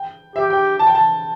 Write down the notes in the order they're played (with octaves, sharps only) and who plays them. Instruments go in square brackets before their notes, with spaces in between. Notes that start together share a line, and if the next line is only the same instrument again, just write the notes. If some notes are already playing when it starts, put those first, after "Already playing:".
Already playing: [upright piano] G5
[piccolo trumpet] G4 [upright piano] E5
[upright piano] G5
A5
G5
A5